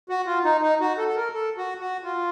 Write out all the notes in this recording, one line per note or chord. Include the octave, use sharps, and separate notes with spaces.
F#4
F4
D#4
D#4
F#4
A4
A4
A#4
A4
F#4
F#4
F4